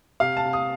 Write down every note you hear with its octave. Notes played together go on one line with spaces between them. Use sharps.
C3 F5
A5
C3
D#6